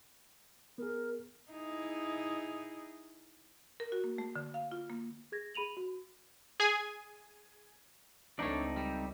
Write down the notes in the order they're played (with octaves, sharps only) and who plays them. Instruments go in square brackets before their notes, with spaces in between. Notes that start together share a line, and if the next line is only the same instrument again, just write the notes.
[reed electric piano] B3 G#4 [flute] A#4
[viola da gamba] D#4 E4 G#4
[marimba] A#4
F#4
A#3
A3
D3
F5
F4
A#3
[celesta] G#4 G#6 A#6
G#4 B5 D#7 F7 F#7
F#4
[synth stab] G#4 G#5
[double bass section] C#2 A3 [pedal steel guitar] C4 D#4 D5 [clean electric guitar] D4 C#5
[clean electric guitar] G3